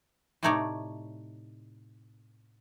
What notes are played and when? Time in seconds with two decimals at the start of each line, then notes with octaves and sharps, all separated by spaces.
0.43 A2 C3 A3 D#4 C#5 D5